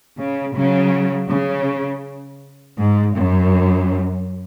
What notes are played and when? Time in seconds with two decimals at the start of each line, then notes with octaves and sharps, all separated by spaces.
0.17 C#3
0.55 C#3 F#3
1.30 C#3
2.79 G#2
3.17 F#2